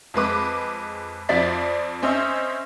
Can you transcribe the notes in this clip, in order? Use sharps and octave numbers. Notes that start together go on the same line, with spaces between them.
F2 G#3 B4 D6
F2 F3 C4 D5 A6 B6
C4 C#4 C5 D#5 E5